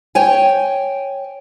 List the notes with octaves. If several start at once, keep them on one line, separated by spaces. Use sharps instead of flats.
C#5 G5 G#5